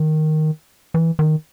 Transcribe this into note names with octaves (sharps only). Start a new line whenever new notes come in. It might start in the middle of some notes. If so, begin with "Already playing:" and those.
Already playing: D#3
E3
D#3